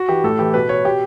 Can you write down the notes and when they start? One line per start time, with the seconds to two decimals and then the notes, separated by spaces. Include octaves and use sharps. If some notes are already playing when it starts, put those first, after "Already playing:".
Already playing: F#4
0.09 E3 G4
0.24 A2 A4
0.39 E3 G4
0.54 B2 B4
0.69 C#5
0.84 B2 G4